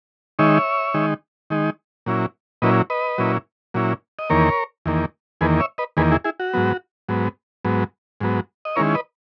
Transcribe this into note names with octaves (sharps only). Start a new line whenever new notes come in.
D#3 G#3 D#4 C#5 E5
D#3 G#3 D#4
D#3 G#3 D#4
A#2 F#3 C#4 E4
A#2 F#3 C#4 E4 B4 D#5
B4 D#5
A#2 F#3 C#4 E4
A#2 F#3 C#4 E4
D#5
E2 D#3 A#3 A#4 C#5
E2 D#3 A#3
E2 D#3 A#3 G#4 B4
C#5 E5
B4 D#5
E2 D#3 A#3 G#4 B4
E4 G#4
E4 G#4
F#4
G#2 F#3 B3
G#2 F#3 B3
G#2 F#3 B3
G#2 F#3 B3
D#5
D#3 G#3 C#4 E4 A#4 C#5
B4 D#5